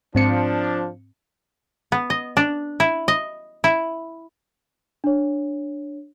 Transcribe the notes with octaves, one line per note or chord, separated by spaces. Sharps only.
G#2 F3 C4 D4 C#7
B3
D#5
D4
E4
D#5
E4
D4 C#5